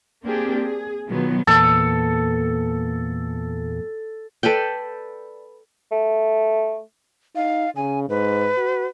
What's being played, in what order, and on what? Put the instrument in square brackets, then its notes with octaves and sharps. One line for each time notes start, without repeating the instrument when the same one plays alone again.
[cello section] A#3 C4 D4 G4 G#4
G#4
B2 D#3 F3 F#3 B3
[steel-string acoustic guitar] E2 A#2 [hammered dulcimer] A4
[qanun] A4 B4 D5 G5
[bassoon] A3
[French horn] D#4 [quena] F5
[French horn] C#3 [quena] G#5
[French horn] G#2 [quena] B4
[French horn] F#4